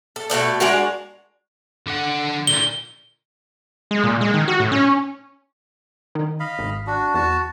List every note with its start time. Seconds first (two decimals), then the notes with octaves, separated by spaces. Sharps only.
0.16 A4
0.30 B2 A3 A4 D5
0.60 G#3 D4 F#4 A#4
1.87 D3 F#5
2.47 A#2 D3 G7
3.91 G#3
4.04 A#2
4.21 G#3
4.34 D#3
4.48 F#4
4.60 A2
4.72 C#4
6.15 D#3
6.40 D#5 F5 B5
6.59 G#1
6.87 D4 F#4
7.15 E2 F#4 A5